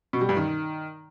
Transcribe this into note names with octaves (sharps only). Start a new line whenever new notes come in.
B2
G3
G2
D#3